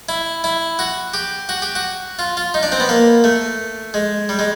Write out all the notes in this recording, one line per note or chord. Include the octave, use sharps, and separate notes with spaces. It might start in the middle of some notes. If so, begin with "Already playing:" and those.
E4
E4
F#4
G4
F#4
G4
F#4
F4
F4
D#4
D4
C4
B3
A#3
A3
G#3
G3
G#3